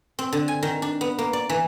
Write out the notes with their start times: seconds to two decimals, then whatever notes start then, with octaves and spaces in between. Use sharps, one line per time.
0.19 C4
0.33 D3
0.48 G#5
0.62 D#3
0.82 D4
1.01 B3
1.19 A#3
1.33 D5
1.49 E3